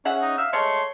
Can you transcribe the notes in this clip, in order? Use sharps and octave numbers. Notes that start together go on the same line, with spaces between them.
C#4 G#4 E5 F#5
D#4
E5 F5
G#3 A3 C#5 C6